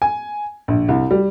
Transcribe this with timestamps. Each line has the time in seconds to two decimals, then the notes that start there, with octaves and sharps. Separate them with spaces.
0.02 G#5
0.68 A#1
0.88 C2
1.11 G3